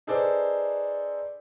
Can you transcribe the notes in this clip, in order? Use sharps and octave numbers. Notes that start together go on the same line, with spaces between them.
D#4 G#4 A4 B4 C5 D5